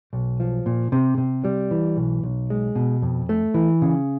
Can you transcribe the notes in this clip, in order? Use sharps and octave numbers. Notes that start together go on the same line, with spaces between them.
B1
F3
A#2
C3
C3
G3
E3
B1
B1
G#3
B2
F2
A3
E3
C#3